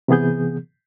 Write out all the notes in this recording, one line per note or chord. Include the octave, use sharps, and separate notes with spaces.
C3 E3 B3 G#4 G6